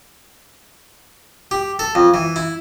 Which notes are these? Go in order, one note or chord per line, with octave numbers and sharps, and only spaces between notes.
G4
A4
F2
E3
E4